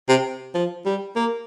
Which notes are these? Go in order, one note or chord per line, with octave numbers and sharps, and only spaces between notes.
C3
F3
G3
A#3